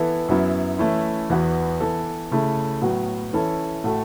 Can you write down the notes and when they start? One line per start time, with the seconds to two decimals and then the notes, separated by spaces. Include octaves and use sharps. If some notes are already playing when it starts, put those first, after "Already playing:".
Already playing: E3 B3 E4 A4
0.28 F#2 F#3 B3 E4
0.79 E3 A3 C#4 E4
1.29 E2 E3 B3 F#4
1.80 E3 B3 A4
2.31 C#3 A3 E4 A4
2.82 A2 F#3 B3 F#4
3.33 E3 C#4 E4 A4
3.84 A2 A3 F#4 A4